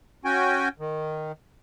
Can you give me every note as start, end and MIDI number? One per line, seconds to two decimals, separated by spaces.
0.25 0.69 61
0.25 0.69 66
0.25 0.69 79
0.25 0.69 80
0.79 1.32 51